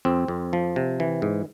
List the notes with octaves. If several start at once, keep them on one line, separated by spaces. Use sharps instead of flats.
F2 C4
F2
F3
C3
E3
G#2